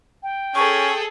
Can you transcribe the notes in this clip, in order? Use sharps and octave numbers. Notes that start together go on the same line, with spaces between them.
G5
C#4 G#4 A4 C#6